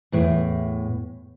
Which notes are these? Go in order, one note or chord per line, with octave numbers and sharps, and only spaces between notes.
E2 A2